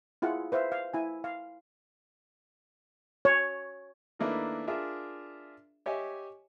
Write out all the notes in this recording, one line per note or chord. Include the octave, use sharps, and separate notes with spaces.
E4 F4 G#4 F#5
B4 C5 E5 F5
F5
E4 G#5
F5
C#5
D#3 A3 A#3 D4 E4 B4
D4 F4 G#4 A#4 E5
G4 C#5 D#5 E5 G#5